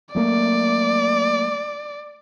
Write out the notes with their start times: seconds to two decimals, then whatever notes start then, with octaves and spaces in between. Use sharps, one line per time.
0.15 F#3 A3 A#3 D5